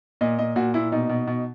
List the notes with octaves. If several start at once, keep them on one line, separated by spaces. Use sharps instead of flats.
A#2 D#5
A#2 D#5
A#2 F#4
A#2 E4
B2 D#4
B2
B2